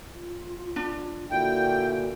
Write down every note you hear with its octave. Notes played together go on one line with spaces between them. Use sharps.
F4
D4
A#2 D3 E4 F#4 G5